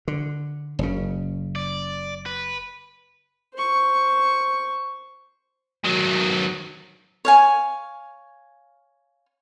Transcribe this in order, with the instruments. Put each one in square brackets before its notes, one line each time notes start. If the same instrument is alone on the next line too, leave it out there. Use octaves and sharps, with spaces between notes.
[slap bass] D3
F#1 C#3
[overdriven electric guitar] D5
B4
[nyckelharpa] C5 C#6
[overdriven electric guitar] D#3 F#3
[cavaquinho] C#5 F5 G#5